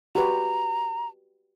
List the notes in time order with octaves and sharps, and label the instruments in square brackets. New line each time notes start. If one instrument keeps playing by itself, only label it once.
[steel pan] F#4 G4 B4 [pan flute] A#5